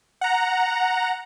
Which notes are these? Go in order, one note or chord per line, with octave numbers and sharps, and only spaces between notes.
F#5 A#5